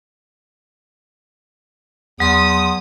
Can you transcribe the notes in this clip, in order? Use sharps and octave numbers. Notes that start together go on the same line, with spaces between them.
E2 F#3 C6 D#6